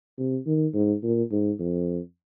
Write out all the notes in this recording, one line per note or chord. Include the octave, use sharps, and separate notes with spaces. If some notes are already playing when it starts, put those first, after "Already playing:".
C3
D#3
G#2
A#2
G#2
F2